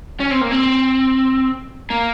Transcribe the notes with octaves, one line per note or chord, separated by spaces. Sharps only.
C#4
C4
A#3
C4
A#3